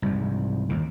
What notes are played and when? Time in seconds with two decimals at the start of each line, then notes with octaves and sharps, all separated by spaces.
0.02 C2 G#2
0.69 D#2 D#3